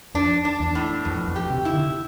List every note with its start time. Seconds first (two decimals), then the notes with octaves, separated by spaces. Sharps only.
0.14 F2 D4
0.45 D4
0.60 E2
0.75 A2
1.05 F2 B2
1.28 F2
1.36 G4
1.50 C3
1.65 E4
1.73 D3